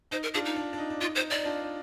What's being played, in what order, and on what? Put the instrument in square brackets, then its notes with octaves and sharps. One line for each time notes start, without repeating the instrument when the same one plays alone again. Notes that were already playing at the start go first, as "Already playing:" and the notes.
[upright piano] D#4 [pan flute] C5
[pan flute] A#4
[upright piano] D4 F4 [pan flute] G#4
[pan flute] D#4
[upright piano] D4
D4
D#4
D4
[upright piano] D#4 [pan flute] F4
[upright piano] D#4 [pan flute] C5
[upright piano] D#4 [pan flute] D5
[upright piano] D4 F4